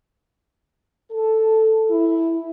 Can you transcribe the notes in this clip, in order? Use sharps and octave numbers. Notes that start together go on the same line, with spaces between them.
A4
E4